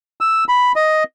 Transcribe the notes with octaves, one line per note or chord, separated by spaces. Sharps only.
E6
B5
D#5